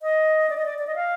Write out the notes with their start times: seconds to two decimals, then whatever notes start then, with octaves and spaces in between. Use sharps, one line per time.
0.02 D#5
0.50 D5
0.57 D#5
0.65 D5
0.79 D5
0.87 D#5
0.95 F5